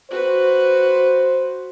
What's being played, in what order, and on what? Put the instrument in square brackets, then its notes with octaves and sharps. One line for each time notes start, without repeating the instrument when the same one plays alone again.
[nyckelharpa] F#4 B4 [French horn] C5